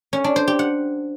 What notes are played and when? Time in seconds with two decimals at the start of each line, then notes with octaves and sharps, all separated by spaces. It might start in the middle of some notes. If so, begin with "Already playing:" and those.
0.13 C#4
0.24 D4
0.36 C5
0.48 G4
0.59 F#5